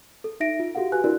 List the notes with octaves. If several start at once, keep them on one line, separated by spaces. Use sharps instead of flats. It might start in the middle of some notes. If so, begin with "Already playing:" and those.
A4
D#4 E5 A#6 D7
F4
F#4 G4 A4 F5 F#5
F#4 G4 B4 G#5 F#6
D4 E4 F#4 A#4 D5